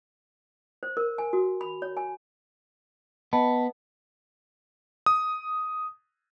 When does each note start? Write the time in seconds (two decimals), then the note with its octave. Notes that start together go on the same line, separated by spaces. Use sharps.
0.83 C5
0.97 A#4
1.18 G#5
1.33 F#4
1.61 B5
1.82 C#5
1.97 G#5
3.33 B3 D#5 A5 B5
5.06 D#6